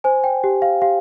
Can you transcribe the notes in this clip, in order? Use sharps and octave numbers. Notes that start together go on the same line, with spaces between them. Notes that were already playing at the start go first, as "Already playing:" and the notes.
C5 G#5
G5
G4
F5
G4 F5